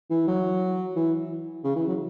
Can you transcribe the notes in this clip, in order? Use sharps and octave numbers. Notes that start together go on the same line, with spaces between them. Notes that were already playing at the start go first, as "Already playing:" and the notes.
E3
F#3
E3
C#3
E3
F#3